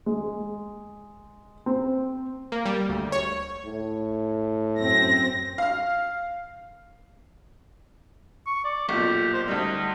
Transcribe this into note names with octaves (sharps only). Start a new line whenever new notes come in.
G#3
C4
A#3
G3
D2
C#5
A2
F#2 C4 A#6
F5 F6
C#6
D5
B1 A#2 G4
C5
D2 G3 D#4